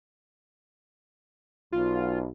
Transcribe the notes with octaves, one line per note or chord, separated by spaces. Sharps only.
B1 F4